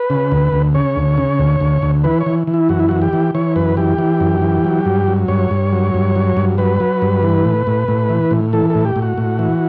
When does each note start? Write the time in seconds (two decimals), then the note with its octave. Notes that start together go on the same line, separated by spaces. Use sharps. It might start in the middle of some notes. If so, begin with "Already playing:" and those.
Already playing: B4
0.10 C#3
0.32 D2
0.52 D2
0.75 C#3 C#5
0.96 D2
1.17 C#3
1.39 D2
1.61 D2
1.82 D2
2.04 E3 B4
2.20 C#5
2.26 E3
2.47 E3
2.54 E4
2.69 F#2 F#4
2.80 E4
2.89 E3 F#4
3.02 G4
3.13 E3
3.35 E3 C#5
3.56 F#2 B4
3.77 E3 G4
3.98 E3
4.20 F#2
4.42 E3
4.65 F#3
4.85 G2
5.08 F#3
5.28 G2 C#5
5.51 G2
5.73 F#3
5.94 G2
6.16 F#3
6.37 G2
6.58 F#3 B4
6.80 F#3
7.02 G2
7.23 E3
7.44 A2
7.67 A2
7.88 A2
8.09 E3
8.31 A2
8.53 E3 A4
8.70 A4
8.75 A2
8.85 G4
8.96 A2
9.02 F#4
9.18 A2
9.39 E3